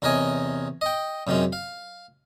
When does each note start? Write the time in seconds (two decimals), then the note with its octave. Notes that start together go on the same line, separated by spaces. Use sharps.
0.02 E2 C3 A#4 C#5 D#5 G#5
0.81 D#5 G5
1.27 F#2 C3 D#3 G#3 C#4
1.53 F5